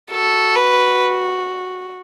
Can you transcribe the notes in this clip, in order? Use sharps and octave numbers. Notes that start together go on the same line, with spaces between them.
F#4 A4
B4